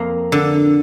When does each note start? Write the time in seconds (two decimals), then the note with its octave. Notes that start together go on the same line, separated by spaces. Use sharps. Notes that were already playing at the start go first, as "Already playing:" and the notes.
Already playing: F2 A#3
0.32 D3